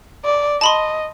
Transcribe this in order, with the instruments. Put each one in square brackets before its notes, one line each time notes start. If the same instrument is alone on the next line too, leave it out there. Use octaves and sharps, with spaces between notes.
[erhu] D5
[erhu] D#5 [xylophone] A5 B5 C6